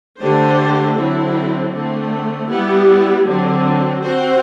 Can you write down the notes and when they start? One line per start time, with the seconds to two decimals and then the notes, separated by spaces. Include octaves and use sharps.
0.19 D3 A3 D4 G4 C5
0.95 D3 F#3 C4 E4
1.72 D3 A3 C4
2.48 G3 B3 E4 G4
3.25 D3 F#3 C4
4.01 C4 F#4 C5